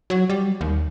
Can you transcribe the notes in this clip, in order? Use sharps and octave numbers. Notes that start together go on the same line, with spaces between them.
F#3
G3
D#2